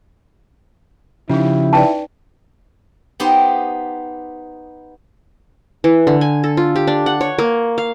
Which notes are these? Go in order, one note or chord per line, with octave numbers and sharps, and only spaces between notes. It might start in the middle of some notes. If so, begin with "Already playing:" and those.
C#3 F3 C#4 D#4 E4 G4
D#4 B4 D5 G5 A5
B3 D#4 G4 C5
E3
D3
G#5
A4
F4
G4
D4
F#5
C#5
A#3
F5